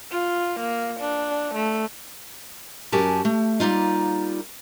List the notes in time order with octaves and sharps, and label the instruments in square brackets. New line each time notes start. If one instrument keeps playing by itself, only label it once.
[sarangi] F4
A#3
D4
A3
[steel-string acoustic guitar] F#2 F#4 G4 A#4 G#5 A5
A3
G3 A#3 D#4 F4